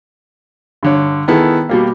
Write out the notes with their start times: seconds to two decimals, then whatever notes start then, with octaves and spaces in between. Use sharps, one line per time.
0.83 G2 D3 C#5
1.28 D#3 B3 E4 G#4 A4
1.69 B2 G3 A#3